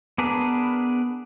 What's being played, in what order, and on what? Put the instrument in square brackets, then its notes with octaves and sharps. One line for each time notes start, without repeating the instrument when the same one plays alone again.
[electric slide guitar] B3 D4 G#4 A#4 B4